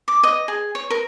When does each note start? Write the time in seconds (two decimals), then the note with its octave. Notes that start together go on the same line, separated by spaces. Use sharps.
0.08 D6
0.23 D#5
0.48 G#4
0.75 C#5
0.90 A#4